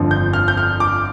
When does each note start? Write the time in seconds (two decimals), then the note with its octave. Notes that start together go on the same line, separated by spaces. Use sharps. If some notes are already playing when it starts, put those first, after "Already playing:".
Already playing: G1 F2 D3 F3
0.11 G6
0.33 F6
0.48 G6
0.57 F6
0.80 D6